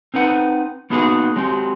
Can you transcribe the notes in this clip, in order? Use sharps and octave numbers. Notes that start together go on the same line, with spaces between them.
C4 D#4 B4 F#5
A#3 B3 D#4 F#4 G#4 B4
F#3 G#3 C4 G4